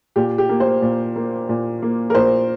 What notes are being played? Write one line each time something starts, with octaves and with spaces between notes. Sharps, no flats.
A#2 G4
G4
A#3
C5
A#2
A#3
A#2
A#3
A#4
A#2 C5